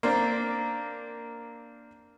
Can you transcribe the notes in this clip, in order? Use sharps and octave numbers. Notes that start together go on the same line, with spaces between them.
A#3 C4 D4